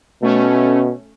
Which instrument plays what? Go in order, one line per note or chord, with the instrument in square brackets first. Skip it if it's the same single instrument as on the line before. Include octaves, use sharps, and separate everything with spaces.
[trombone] B2 [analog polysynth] A3 C#4